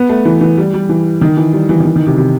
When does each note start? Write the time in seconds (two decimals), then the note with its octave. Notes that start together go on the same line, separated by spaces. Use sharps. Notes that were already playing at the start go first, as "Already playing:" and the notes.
Already playing: B3
0.09 A3
0.25 E3
0.41 E3
0.57 G3
0.74 G3
0.89 E3
1.21 D#3
1.37 E3
1.53 G3
1.69 E3
1.80 D#3
1.85 E3
1.96 D#3
2.07 C3
2.17 C3